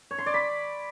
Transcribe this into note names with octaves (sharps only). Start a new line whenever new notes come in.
C#5
C6
D5
B5